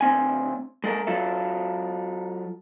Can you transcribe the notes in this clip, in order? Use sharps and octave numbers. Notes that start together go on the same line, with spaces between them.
D2 C4 G#5
G#3 A4 A#4
F#3 F4 A4 E5